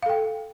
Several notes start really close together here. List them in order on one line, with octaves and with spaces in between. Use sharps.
F5 A4 G5